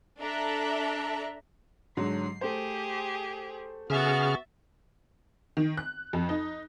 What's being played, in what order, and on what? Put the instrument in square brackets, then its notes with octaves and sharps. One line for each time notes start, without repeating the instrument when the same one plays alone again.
[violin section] D4 A4 E5 A#5 F#6
[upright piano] G#2 D3 F#3 [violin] C7
[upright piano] A3 C5 [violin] G4 G#4
[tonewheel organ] C#3 G#4 F6 [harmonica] B3 F#4 [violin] E5 A6
[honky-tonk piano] D#3
F#6
F2
D#4